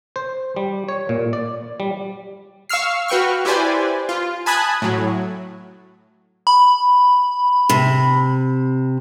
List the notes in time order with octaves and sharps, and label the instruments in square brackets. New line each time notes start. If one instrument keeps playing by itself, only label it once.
[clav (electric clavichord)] C5
G3
C#5
A#2
D5
G3
[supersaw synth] F5 C#6 E6 F6 C7
F#4 B4 G5 C#6 F6
E4 G4 B4 C5 D5 G#5
F4
G#5 A5 B5 D#6 F#6 G#6
A2 F#3
[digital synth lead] B5
[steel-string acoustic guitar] C3